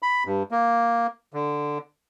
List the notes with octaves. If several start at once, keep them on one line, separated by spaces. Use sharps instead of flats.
B5
G2
A#3
D3